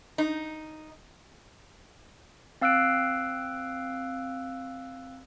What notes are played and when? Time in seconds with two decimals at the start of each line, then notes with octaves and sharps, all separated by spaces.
0.18 D#4
2.61 C4 F5 E6 F#6 C7 D7